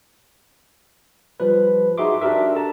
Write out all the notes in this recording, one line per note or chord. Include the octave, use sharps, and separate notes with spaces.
F3 G3 B4
D#4 F#4 G#4 E5 C6 D6
D4 F#4 G4 A#4 E5
A4 A5 A#5